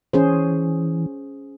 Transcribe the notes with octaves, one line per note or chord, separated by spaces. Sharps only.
E3 C#4 G#4 C5